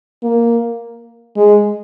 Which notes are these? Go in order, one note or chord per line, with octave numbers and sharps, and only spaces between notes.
A#3
G#3